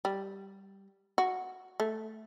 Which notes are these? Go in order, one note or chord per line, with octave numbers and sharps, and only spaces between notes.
G3
F#4
A3